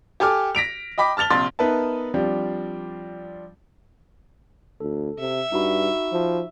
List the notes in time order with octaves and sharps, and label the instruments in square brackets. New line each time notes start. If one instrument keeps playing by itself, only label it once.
[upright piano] G4 A4 G#5 D6 F6
A#6 B6 D7 F7
D#5 G5 B5 D6 B6
A5 F6 A6 F7 G7
A#1 C3 C6 A6
[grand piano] B3 D#4 A#4 B4 E5 A5
F3 G3 C4 D4
[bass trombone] D2 [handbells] A4
[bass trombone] C3 [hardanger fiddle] E5
[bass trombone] G2 [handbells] D#4 F#4 B5
[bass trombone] F3